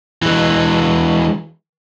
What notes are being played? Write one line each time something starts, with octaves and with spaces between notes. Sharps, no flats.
E3 G#3